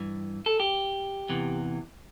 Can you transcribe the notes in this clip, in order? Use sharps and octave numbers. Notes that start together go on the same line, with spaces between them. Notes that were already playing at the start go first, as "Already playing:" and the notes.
Already playing: G2 E3
A4
G4
E2 C3 E3